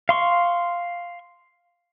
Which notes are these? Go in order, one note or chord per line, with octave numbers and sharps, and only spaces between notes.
F5 C6 C#6